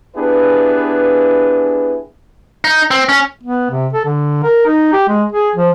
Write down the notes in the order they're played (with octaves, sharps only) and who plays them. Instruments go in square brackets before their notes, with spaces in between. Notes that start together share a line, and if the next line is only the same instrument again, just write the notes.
[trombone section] B3 D4 E4 G4 G#4 B4
[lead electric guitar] D#4
C4
C#4
[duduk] B3
C3
A4
D3
A#4
D#4
G4
G#3
G#4
F3